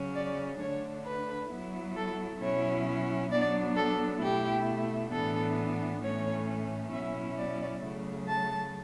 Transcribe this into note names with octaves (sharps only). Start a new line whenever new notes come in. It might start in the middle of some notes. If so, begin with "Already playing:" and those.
Already playing: C#3 F#3 C#4
D5
D3 A3 D4 C#5
B4
F#3 B3 E4
A4
B2 F#3 C#4 E4 C#5
F#3 B3 D4 D5
A4
B2 A3 E4 G4
A2 E3 B3 D4 A4
A2 E3 A3 C#4 C#5
B2 F#3 C#4 E4 E5
D5
C#3 F#3 A3
A5